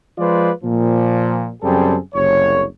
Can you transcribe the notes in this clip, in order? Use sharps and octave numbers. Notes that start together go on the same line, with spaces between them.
F3 G#3 F4 B4 C5 D5
A#2 F3
F#2 C#3 G3 C4 G#4 A4
F#1 C2 C#5